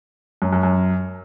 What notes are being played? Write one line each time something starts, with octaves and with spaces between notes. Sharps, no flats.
F#2
F#2
F#2